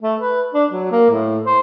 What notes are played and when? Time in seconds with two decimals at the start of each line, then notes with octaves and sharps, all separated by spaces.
0.02 A3
0.20 B4
0.54 D4
0.71 F#3
0.92 A#3
1.10 A2
1.46 C5